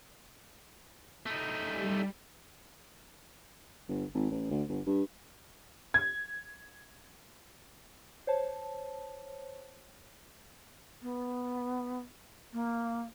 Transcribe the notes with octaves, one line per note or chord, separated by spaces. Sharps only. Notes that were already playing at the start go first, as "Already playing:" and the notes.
A3 D#4
G3
G1
G#1
A1
D2
G1
G2
G#6
C5 C#5 A5
B3
A#3